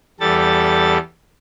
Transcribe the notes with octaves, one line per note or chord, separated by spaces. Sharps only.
E2 G3 A4 A6